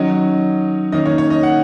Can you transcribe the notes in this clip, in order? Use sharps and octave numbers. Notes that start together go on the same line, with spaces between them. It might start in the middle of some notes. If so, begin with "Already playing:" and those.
Already playing: D#3 F#3 C#4 D#5
D#3 A#3 C#4 D#5
C#5
C#5
D#5
F#5